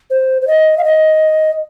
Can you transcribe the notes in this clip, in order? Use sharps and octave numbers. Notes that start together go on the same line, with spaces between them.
C5
C5
D#5
F5
D#5